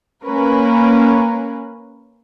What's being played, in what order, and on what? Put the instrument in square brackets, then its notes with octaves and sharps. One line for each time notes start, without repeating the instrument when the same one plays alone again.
[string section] A#3 C#4 A#4 B4